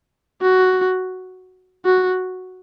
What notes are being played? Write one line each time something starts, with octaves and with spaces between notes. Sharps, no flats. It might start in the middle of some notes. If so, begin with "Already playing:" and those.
F#4
F#4